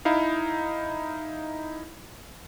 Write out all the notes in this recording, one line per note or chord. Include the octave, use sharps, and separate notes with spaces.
D#4 E4 F5